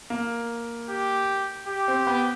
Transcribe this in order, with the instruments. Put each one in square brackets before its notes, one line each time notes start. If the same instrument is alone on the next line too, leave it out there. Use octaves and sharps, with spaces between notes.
[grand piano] A#3
[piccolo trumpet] G4
G4
[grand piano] C4
B3